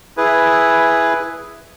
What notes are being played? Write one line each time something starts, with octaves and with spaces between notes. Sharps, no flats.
E4 G#4 B4